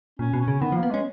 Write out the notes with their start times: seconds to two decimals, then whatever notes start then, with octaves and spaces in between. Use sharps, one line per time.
0.19 A#2 C#4
0.33 B2
0.41 C#4
0.48 C#3
0.61 D#3 B3
0.72 F3
0.76 A#3
0.83 B3
0.90 G#3 C#4